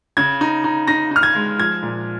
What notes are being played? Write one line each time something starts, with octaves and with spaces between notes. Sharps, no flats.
C#3 G#6
D#4
D#4
D#4 A#6
D#4 F6
G#6
G#3
F3 G#6
A#2